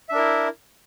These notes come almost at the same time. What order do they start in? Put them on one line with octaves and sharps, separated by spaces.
E5 D4 A#4 E4